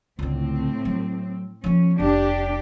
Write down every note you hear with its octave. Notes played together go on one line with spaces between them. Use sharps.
C#2 A2 D3 C4
F#3
F3 A#3 C#4
F1 D4 G4